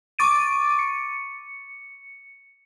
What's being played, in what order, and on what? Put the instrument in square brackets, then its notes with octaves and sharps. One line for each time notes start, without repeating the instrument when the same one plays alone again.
[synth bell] C#6 D6 A6 D7 D#7
C#7